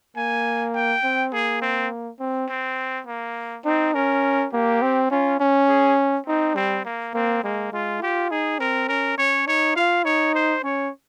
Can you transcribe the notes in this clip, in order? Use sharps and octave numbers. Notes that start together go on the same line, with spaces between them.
A#3 G#5
G5
C4
A#3 G#4
C4
C4
C4
A#3
C4 D#4
C#4 A#4
A#3 G4
C4
C#4 F4
C#4
G#4
C4 D#4
G3 C4
A#3
A#3 C4
G#3 A#3
G#3 F4
F4 G4
D#4 G#4
C4 A#4
C#4 A#4
C#4 C#5
D#4 C#5
F4 F5
D#4 C#5
C5
C#4 C#5